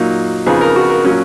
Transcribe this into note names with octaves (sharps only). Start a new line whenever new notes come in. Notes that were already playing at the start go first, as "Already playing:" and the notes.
Already playing: A#2 F#3 A#3 D#4
F2 C#3 F3 B3 D#4 G#4
A#4
F#4
A#4
A#2 F#3 C#4